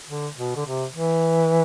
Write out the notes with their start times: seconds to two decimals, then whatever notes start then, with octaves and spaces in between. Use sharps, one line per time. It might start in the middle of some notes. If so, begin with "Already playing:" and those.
0.08 D3
0.37 B2
0.56 D3
0.66 C3
0.94 E3